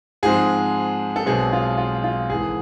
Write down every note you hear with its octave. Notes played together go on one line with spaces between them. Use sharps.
G#2 F3 G#3 C4 G#4
A4
B1 B2 G#3 C4 G#4
F4
F4
F4
G#1 G#2 E3 G#3 G#4